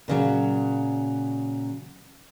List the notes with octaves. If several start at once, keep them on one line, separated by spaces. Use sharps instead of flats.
A#2 C#3 F#3